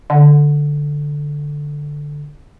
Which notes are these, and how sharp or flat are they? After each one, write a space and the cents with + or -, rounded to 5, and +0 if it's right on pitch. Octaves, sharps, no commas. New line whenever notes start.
D3 +0